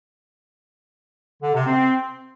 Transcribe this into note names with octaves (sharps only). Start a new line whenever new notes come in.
D3
C3
C4